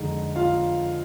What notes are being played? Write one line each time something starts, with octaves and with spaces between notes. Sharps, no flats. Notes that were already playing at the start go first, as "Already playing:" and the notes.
Already playing: F2 D3 G#3 D#4
F4 F5